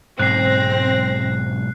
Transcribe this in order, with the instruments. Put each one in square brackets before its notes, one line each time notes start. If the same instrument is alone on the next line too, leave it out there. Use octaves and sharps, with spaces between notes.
[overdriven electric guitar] B1 G#2 [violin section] C4 A#6 [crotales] F#6 C7